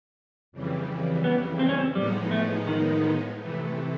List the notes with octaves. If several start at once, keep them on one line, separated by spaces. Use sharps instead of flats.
F2 C#3 E3 G3
B3
C4
C#4
C4
A2 F3 G3 G#3 B3 D#4
A3
D#3
C3 E3 A3